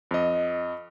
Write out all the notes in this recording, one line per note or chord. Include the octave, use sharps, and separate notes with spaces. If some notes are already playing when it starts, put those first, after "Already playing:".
F2 D#5